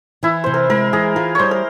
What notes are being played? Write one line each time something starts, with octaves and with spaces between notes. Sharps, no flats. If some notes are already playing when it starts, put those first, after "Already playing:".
E3 E4
C3 C5
A#4
G#3 A#4
E3 G#4
F4 A#4
G3 C5 C#5
A#4